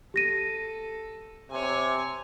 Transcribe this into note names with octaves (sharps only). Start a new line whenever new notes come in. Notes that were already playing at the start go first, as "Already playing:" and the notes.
G4 A4 A#6 D#7
C3 C#5 G#5